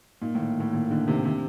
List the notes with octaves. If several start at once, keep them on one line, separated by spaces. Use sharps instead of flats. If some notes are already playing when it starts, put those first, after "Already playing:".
A#2 D#4
A2 D#3
A2 A#3
A#2 D#3
D3 D#4
C3 D#3
C3 D4